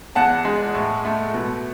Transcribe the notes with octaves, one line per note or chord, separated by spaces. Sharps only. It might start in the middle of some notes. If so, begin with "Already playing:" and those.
E2 F#5 A5
G#3
A2
A3
B2